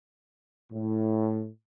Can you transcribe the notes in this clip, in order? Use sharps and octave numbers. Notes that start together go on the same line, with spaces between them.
A2